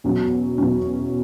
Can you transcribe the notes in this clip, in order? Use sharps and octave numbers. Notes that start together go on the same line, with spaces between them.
E2 B2 F#3 C#4
E2 B2 F#3 C#4